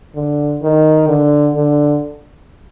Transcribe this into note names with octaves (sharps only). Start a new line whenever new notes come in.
D3
D#3
D3
D3